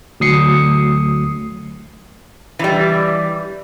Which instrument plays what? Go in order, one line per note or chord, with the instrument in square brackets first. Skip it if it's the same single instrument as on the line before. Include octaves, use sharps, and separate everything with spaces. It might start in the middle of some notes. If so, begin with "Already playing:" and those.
[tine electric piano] D2 F#3 D#6 C7 C#7
[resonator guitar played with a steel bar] E3 G3